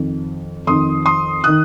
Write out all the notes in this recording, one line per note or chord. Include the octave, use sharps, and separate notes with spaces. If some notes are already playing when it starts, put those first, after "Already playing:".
Already playing: F2 D#3
F2 D#3 C6 D#6
C6 D#6
D#3 D#6 F#6